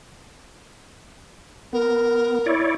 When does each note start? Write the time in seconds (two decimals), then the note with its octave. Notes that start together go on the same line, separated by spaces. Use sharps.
1.73 B3 A#4
2.46 E4 C#5 D5